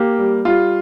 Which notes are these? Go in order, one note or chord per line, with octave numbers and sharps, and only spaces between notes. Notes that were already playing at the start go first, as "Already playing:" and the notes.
Already playing: A#3 G4
G3
G3 F4